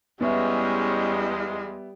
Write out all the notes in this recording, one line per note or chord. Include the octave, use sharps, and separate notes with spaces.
E2 G3 G#3 B3 C#4 E5